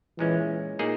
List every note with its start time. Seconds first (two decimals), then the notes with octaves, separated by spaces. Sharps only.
0.18 A#2 E3 G#3 C#4
0.79 A#2 A#3 D#4 G#4